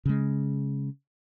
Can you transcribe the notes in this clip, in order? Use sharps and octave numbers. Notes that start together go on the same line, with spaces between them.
C#3 G#3